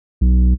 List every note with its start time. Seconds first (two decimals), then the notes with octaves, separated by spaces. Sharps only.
0.21 B1